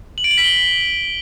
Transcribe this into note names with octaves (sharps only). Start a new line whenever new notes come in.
F#7
D7
F#7
B6
G7